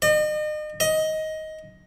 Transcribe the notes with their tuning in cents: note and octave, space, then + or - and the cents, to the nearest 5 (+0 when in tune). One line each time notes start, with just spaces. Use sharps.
D#5 -35
D#5 +15